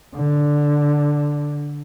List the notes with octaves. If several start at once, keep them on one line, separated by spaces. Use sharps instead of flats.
D3